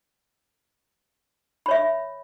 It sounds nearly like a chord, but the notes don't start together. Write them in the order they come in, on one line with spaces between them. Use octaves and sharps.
B5 C#5 E5